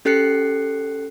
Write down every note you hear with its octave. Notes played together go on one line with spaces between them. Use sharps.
C#4 G4 A4 F#6 C7 C#7